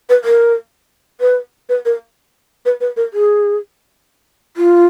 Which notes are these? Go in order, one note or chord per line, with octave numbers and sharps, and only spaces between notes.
B4
A#4
B4
B4
A#4
B4
B4
A#4
G#4
F4